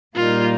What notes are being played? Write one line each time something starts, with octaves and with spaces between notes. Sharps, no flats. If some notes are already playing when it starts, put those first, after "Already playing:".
A#2 G3 A#3 D#4 F4